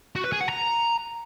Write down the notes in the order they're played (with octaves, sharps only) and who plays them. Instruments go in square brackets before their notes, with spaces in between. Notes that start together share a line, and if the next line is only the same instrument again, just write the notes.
[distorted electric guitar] F#4
B4
G#4
F#5
A#5